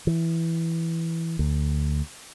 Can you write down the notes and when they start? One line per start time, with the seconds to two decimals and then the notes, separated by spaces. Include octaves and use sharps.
0.07 E3
1.39 D2